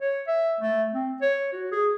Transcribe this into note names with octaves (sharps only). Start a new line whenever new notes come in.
C#5
E5
A3
C4
C#5
F#4
G#4